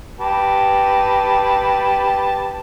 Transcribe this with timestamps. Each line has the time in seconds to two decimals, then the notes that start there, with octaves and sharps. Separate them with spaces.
0.20 G4 B4 A5